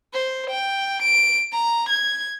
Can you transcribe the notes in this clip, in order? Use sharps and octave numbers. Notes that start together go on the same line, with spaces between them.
C5
G5
D7
A#5
G#6